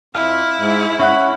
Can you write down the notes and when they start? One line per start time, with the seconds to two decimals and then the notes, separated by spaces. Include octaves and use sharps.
0.15 F2 E4 F5
0.58 G#2
0.99 C#4 E5 F#5 B5 F#6